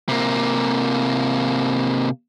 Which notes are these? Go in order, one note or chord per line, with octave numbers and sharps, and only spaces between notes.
C3 A#3